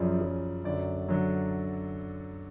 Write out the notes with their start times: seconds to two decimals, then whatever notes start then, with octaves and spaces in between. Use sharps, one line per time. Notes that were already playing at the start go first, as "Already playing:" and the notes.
Already playing: F#2 C#3 F3 D5
0.21 F#2 C#3 F3
0.64 F#2 D3 F#3 D5
1.08 D3 F#3